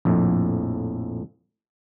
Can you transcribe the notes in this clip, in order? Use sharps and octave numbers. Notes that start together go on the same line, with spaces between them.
A#1 F2 A2